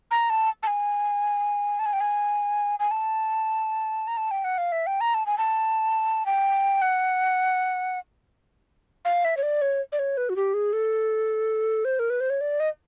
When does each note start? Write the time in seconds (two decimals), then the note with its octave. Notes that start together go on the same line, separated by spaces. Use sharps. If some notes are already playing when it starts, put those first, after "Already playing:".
0.11 A#5
0.30 A5
0.63 A5
0.67 G#5
1.79 A5
1.86 G#5
1.93 G5
2.01 G#5
2.80 G#5
2.91 A5
4.07 A#5
4.17 A5
4.31 G5
4.44 F#5
4.58 F5
4.72 E5
4.87 G5
5.01 A#5
5.14 A5
5.26 G#5
5.38 A5
6.26 G5
6.82 F#5
9.05 F5
9.25 E5
9.37 C#5
9.43 D5
9.62 C#5
9.92 D5
9.99 C#5
10.17 B4
10.29 F#4
10.36 G4
10.54 G#4
10.73 A4
11.85 C5
11.99 A#4
12.10 B4
12.20 C5
12.30 C#5
12.41 D5
12.60 D#5